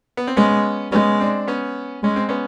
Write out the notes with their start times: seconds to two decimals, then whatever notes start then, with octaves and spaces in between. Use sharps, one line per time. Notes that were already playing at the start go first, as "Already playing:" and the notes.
0.17 B3
0.27 C4
0.37 G#3 B3 C#4
0.92 G#3 B3 C#4
1.20 C4 D4
1.48 B3 C#4
2.03 G#3 C#4
2.16 C4
2.29 B3 C#4